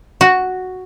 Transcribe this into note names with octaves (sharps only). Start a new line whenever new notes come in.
F#4